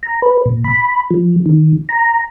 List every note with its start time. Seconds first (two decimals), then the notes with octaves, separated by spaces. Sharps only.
0.03 A#5
0.22 B4
0.46 A#2
0.64 B5
1.11 F3
1.46 D#3
1.89 A#5